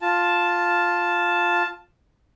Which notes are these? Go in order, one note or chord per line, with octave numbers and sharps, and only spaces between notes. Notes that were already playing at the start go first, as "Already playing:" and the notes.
F4 A5